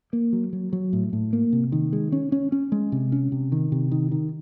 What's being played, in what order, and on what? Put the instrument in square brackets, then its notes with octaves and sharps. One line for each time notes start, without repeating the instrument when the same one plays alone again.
[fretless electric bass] A#3
F#3
F#3
F#3
A2
A2
A#3
C3
D#3
G#3
C#4
C#4
C#4
G#3
C3
C#4
C3
D#3
C3
D#3
D#3